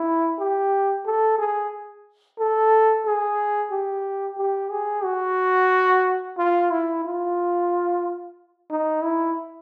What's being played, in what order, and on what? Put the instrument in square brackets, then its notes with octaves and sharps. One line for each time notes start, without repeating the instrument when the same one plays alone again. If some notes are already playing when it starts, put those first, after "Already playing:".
Already playing: [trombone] E4
G4
A4
G#4
A4
G#4
G4
G4
G#4
F#4
F4
E4
F4
D#4
E4